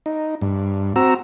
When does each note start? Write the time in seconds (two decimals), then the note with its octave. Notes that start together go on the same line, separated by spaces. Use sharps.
0.06 D#4
0.41 G2
0.96 C4 F#4 A#5 E6